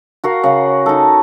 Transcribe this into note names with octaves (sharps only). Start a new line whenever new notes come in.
F#4 A#4 F5
C#3 F#5
D#4 A4